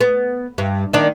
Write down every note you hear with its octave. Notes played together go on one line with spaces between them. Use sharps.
B3
G2
D#3 A#3 D4